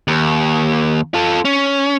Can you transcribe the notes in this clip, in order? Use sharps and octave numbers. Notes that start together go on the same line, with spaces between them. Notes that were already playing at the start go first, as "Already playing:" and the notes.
D#2
F4 A4
C#4